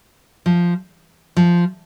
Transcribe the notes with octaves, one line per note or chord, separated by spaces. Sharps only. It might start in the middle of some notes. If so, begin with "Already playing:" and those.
F3
F3